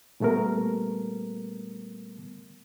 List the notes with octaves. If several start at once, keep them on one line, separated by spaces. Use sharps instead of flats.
A#2 G3 A3 B3 A#4